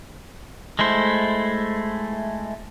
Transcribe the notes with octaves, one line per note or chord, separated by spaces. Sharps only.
G#3 A3 E4 C5